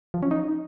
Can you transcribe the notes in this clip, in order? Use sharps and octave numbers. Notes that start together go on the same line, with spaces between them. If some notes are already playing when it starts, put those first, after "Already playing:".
F3
C#4
D#4